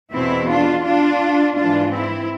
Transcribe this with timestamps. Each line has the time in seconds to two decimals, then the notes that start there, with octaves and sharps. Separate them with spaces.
0.12 E2 B2 C4 E4
0.48 D4 F4
0.83 D4 F4
1.55 G#2 E3 D4 F4
1.91 C4 E4